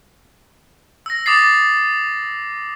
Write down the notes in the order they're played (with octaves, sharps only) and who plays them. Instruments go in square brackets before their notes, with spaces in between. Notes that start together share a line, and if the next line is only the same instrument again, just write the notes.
[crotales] E6 A#6
D6 D#6 A6 C7